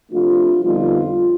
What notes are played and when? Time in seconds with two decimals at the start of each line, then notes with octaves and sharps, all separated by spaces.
0.12 C3 F3 A3 D4 F4
0.63 F2 D3 G3 B3 D#4 F4